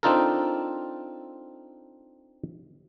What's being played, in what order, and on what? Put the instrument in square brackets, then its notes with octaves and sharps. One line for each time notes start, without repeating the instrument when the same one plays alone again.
[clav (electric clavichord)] C4 D4 D#4 F4 A4 A#4